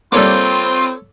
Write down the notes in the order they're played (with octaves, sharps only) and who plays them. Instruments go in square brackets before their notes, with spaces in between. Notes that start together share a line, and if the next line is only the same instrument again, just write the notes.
[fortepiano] G3 A#3 [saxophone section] C4 [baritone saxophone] F4 [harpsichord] A4 C#5 D6